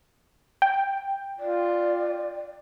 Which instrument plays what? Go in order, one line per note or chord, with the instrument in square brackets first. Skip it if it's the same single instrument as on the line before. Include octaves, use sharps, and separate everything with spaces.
[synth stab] G5
[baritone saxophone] F4 [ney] D5